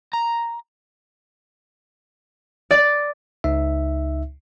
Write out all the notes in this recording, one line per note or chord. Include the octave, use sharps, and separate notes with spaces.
A#5
D5
C#2 D#4 E5